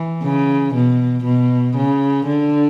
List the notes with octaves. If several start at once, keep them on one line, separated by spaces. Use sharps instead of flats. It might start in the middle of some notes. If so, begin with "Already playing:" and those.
Already playing: E3
C#3
B2
B2
C#3
D3